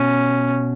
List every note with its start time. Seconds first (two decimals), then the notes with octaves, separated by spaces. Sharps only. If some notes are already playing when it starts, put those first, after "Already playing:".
Already playing: B2 C#4